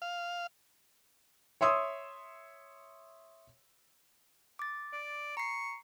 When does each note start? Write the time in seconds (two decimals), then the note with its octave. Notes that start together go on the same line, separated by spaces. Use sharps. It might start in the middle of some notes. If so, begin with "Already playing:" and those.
0.02 F5
1.61 C#5 E5 C6 D#6 E6
4.59 D6 A6
4.93 D5
5.37 A#5 C#6 C7